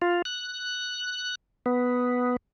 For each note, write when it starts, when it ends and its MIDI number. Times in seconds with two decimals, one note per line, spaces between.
0.02 0.22 65
0.25 1.35 90
1.66 2.36 59